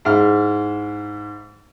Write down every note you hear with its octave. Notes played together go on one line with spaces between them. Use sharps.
G#2 E4 F6